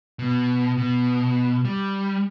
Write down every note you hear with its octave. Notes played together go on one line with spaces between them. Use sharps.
B2
B2
G3